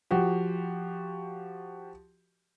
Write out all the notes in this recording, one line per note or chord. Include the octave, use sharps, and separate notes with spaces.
F3 F#4 G4